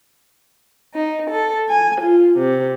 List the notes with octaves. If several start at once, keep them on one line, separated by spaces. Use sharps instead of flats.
D#4
A4
G#5
F4
C3